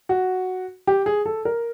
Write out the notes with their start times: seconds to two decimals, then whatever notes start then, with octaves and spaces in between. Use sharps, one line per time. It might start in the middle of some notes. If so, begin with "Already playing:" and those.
0.09 F#4
0.87 G4
1.06 G#4
1.26 A4
1.45 A#4